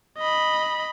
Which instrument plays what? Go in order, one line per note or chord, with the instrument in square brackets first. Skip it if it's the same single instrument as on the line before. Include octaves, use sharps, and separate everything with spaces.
[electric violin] D#5 B5